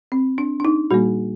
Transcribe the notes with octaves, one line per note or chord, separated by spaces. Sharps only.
C4
D4
D4
D#4
A#2 G3 A#3 F#4